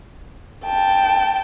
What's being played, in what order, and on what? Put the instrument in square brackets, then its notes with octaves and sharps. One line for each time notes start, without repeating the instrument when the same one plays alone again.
[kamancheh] G5 A5